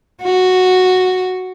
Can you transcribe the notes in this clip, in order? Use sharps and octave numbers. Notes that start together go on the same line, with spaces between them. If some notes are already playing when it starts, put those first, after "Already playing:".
F#4